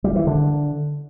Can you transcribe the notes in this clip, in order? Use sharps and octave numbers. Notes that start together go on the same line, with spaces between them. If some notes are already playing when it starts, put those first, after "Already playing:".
G3
E3
D3